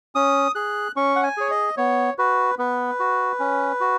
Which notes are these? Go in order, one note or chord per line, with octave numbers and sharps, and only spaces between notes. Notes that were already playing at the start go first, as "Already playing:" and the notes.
C#4 D#6
G#4 F#6
C#4 C#6
F#5
G#5
G#4 C#5
D#5
B3 C#5
F#4 B4
B3 B4
F#4
C#4
F#4